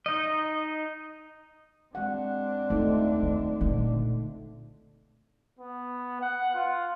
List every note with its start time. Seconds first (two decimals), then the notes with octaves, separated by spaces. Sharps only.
0.06 D#4 D#5
1.95 G#3 C4 D4 F#5
2.70 D#2 A3 D#4 F4
3.22 D#3
3.61 A#2 D3
5.59 B3
6.21 F#5
6.55 F4